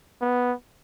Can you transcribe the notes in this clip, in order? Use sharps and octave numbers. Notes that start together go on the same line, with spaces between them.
B3